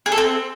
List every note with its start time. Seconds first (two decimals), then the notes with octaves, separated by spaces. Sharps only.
0.06 G#4
0.12 A4
0.18 C4